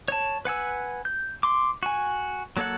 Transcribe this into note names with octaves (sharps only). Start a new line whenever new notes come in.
C#5 A5
B4 F#5 G#5 E6
G6
C6 D6
F#4 G#5
F#3 A#3 A4 C#5 F#5